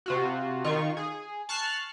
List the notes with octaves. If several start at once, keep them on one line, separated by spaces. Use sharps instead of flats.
C3 F4 F#4
D#3 F4 C#6
G#4
A5 C#6 F6 F#6 C7